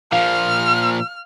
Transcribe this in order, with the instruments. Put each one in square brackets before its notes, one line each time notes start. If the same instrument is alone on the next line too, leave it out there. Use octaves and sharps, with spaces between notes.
[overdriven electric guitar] A#2 F3 [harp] F5 [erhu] F6